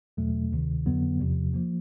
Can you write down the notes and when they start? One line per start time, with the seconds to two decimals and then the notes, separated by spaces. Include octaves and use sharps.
0.17 E2 B2 F#3 A3
0.52 D2 C3 D#3
0.86 F2 D3 F#3 B3
1.20 E2 C3 F3
1.54 F3 A#3